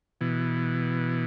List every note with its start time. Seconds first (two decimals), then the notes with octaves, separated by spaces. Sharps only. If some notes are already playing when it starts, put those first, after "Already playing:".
0.21 B2 E3